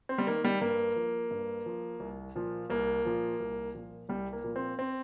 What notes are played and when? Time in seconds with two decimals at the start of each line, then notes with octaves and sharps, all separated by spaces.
0.09 C4
0.18 G3
0.27 D#3 A#3
0.44 G3
0.61 G2 A#3
0.96 F3
1.31 G2
1.66 F3
2.00 C2
2.35 A#2 F3
2.70 C2 A#3
3.05 A#2 F3
3.40 C2
3.74 A#2 F3
4.09 C2 G3
4.33 A#3
4.44 A#2 F3
4.56 C4
4.79 C4